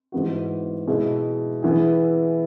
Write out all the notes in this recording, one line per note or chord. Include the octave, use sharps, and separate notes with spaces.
G#2 E3 B3 F#4
B2 G#3 E4 G#4
E3 B3 E4 G#4